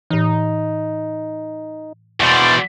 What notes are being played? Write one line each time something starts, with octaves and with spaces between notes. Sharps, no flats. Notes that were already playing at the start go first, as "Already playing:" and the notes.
A2 E3 D#4
E2 B2 C5 D5